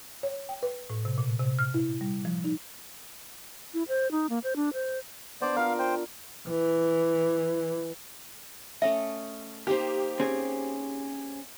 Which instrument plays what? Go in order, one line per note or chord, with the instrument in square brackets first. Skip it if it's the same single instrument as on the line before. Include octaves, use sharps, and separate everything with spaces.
[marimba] C#5
G5
B4
A2
C3
A#2
C3
F6
E4
G3
F3
D#4
[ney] E4
C5
D#4
A#3
C5
D4
C5
[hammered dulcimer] B3 D4 [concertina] C5 D5
[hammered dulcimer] F4 A#4 [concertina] F5
[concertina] C5 G5
[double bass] E3
[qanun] A3 C#4 D#5 [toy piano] E5
[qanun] A#3 D#4 C5 [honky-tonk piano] G4
[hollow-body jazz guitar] C4 C#4 G#4